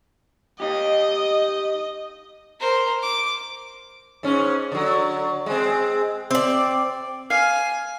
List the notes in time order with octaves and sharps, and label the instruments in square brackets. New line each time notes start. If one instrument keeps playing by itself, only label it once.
[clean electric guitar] D#4 G4 [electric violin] D#5
[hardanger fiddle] A#4 C5
D6
[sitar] G#2 C#4
D3 F#3
G#3 C4
[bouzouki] C4 D5
[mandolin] F5 [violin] G#5